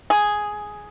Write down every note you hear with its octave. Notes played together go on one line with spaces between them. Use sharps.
G#4